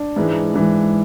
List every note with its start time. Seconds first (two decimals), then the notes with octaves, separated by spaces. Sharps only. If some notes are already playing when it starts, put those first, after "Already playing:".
Already playing: D4
0.16 G#2 E3 G#3
0.54 G#2 E3 G#3